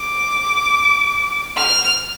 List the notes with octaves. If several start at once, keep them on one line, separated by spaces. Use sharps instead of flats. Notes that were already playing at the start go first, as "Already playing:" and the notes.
Already playing: D6
F6